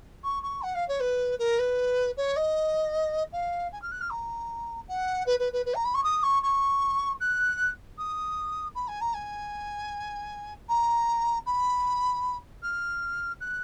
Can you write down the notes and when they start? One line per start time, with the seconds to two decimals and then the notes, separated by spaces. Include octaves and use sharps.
0.23 C#6
0.42 C#6
0.62 F#5
0.74 F5
0.88 C#5
1.00 B4
1.38 A#4
1.58 B4
2.17 C#5
2.36 D#5
3.32 F5
3.72 G#5
3.81 F6
3.91 F#6
4.00 F6
4.10 A#5
4.88 F#5
5.26 B4
5.39 B4
5.52 B4
5.65 B4
5.74 A#5
5.84 B5
5.94 C#6
6.03 D#6
6.23 C#6
6.42 C#6
7.20 F#6
7.98 D#6
8.75 B5
8.87 G#5
9.00 A#5
9.13 G#5
10.68 A#5
11.46 B5
12.62 F6
13.40 F#6